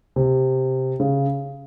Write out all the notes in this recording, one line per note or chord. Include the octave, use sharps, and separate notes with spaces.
C3
C#3